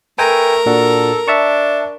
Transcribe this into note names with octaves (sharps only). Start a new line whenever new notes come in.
A3 A#4 B4 G5 G#5
A#2 D4 F#4 A4
D4 E5 A5 C#6